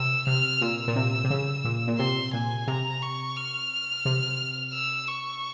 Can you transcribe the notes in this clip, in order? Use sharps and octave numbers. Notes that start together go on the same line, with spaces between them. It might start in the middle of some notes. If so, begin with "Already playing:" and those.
Already playing: C3 E6
C3 F6
A#2 E6
A#2
C3
C3
C#3
A#2
A#2
C3 C6
A#2 G#5
C3 A#5
C#6
F6
C3
E6
C#6